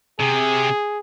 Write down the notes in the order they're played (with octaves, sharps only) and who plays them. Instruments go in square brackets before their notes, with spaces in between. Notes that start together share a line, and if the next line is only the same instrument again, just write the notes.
[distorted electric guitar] C3 [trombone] G#4